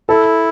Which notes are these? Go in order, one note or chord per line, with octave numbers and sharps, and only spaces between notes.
E4 A4